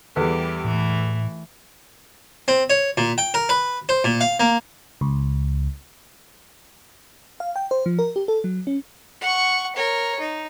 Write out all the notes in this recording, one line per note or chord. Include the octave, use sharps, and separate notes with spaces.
E2 E3 G3 G4 A4 B4
A2 E3 A3
C4
C#5
A#2
G5
A#4
B4
C5
A#2
F5
A#3
C#2
F5
G5
C5
F3
A#4
G4
A4
F#3
C#4
F#5 C#6
A#4 C#5
D#4